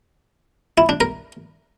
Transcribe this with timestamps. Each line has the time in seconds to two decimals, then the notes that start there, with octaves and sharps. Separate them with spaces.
0.78 E4
0.89 D4
1.01 A#4